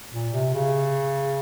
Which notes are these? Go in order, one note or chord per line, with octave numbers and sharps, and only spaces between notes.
A#2
C3
C#3